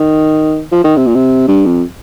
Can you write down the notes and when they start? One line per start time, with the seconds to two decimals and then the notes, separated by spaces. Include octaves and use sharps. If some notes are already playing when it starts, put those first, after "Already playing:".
Already playing: D#3
0.72 F3
0.84 D#3
0.97 C3
1.07 A#2
1.15 C3
1.48 G2
1.65 F2